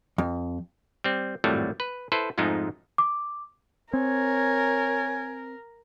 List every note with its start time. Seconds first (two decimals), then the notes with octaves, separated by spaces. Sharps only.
0.18 F2
1.04 G3 C4
1.44 G#1 F2 A2 F#3 G3 A3
1.80 B4
2.12 E4 A4 B4 C5
2.38 F2 G#2 F3 G#3 A3 D#4
2.98 D6
3.93 C4 A#4 C#5 G#5